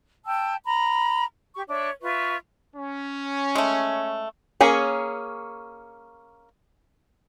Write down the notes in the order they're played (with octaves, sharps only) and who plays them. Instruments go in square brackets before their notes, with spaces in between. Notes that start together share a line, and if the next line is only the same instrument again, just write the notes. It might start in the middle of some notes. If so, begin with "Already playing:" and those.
[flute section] G5 A5 E6
A#5 B5
G4 C#6
D4 C#5 E5
F4 B4 E5 C#6
[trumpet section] C#4
[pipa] G#3 A3
[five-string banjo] A#3 C#4 G#4 C#5